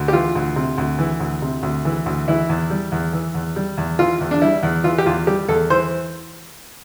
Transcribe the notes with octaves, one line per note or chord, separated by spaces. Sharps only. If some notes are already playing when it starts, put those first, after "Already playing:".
Already playing: D2
G4
E3 F4
D2
C3
D2
E3
D2
C3
D2
E3
D2
E3 E4
E2
G3
E2
E3
E2
G3
E2
E3 F4
E2
D4
G3 E4
E2
E3 F4
G4
E2 F4
G3 G4
E2 A4
E3 C5